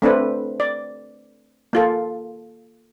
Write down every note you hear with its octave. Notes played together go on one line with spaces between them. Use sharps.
A3 C4 D4 B4
D5
A#3 F4 A4